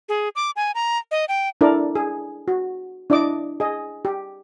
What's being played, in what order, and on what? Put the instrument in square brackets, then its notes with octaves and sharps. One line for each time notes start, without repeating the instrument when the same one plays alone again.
[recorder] G#4
D6
G#5
A#5
D#5
G5
[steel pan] D4 E4 A4 A#4 D5
G#4
F#4
D4 E4 D5 D#5 D6
G#4 D#5
G4